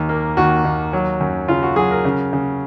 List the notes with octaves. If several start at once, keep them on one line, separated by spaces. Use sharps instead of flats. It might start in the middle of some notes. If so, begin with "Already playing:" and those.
Already playing: D#2
A#3
D#2 F#4
D#2
F#3
F#2
C#3 F4
F#4
F#3 G#4
A#4
C#3
C#3